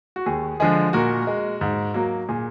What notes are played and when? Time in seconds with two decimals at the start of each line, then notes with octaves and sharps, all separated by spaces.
0.16 F#4
0.26 D#2 G#4
0.60 D3 F3 G#3 G#4
0.93 A#2 F#4 A#4
1.27 G#3
1.61 G#2
1.94 F#3 A#3
2.29 A#2 G#4